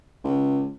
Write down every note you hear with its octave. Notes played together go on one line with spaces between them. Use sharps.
C#2